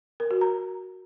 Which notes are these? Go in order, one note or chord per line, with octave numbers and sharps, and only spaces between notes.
A#4
F#4
A#5